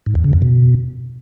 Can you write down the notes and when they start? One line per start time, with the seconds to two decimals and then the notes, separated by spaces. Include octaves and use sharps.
0.06 G#2
0.15 E2
0.24 C#3
0.33 F2
0.42 B2